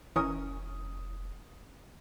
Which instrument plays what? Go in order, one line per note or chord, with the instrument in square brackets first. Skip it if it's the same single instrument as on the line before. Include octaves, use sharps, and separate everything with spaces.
[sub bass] F1 [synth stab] E3 C#4 A#4 [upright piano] D#6